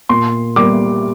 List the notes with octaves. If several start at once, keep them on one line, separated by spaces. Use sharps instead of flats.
A#2 C6
G3 A#3 D6